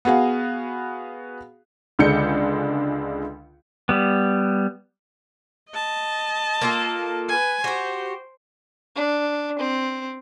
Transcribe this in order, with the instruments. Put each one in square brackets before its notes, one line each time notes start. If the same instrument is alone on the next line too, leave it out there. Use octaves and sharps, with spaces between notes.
[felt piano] B3 F#4 G#4 F5
[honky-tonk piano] C#2 D3 G#3 D4 G6 C#7
[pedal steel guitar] G3 B3
[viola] D#5 A5
[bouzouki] A#3 F4 A4
[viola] B4 G#5
[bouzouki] F#4 G4 [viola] C5
[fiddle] D4
C4